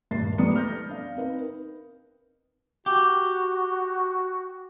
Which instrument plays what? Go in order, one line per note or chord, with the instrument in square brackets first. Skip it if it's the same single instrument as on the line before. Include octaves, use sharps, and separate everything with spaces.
[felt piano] D#1 G2 A#3 A6 C7
G3 A3 B4 A#5 D#6 C#7
F6 G6 A#6
D4 F5
C4 D#4 A#4 B4
[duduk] F#4 [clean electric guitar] G4